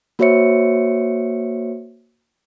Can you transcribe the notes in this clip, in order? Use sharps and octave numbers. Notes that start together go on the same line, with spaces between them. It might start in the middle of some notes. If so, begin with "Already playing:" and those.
A#3 F#4 C5 C#5 E5 C#7